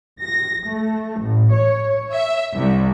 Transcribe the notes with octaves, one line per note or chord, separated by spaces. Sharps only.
A#6
A3
A1
C#5
E5
C2